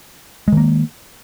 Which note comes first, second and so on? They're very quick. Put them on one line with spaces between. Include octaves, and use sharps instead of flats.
G#3 D#3 A#3